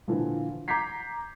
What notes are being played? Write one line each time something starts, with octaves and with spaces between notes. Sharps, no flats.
A#2 D3 E3 F3
A#5 D6 G6 G#6 B6 C7